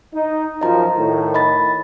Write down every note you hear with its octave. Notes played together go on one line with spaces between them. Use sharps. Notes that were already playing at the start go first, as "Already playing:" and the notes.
D#4
F#2 F3 D#5 A#5
A2 D#3
D#5 B5 A6